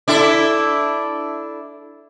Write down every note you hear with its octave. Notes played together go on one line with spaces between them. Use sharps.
D4 E4 A4